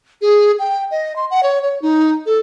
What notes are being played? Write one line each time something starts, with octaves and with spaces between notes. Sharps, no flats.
G#4
G5
D#5
C6
F#5
C#5
C#5
D#4
A4